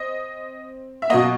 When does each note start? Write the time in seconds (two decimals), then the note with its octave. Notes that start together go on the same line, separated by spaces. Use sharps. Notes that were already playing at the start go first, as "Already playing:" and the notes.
Already playing: C4 D#5
1.02 E5
1.10 B2 F#3 A#3 D#5